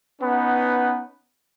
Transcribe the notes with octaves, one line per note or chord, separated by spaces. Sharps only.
B3 C#4 D#4 B4 F#5